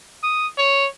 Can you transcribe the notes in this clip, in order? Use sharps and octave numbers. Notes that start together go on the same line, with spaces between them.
D#6
C#5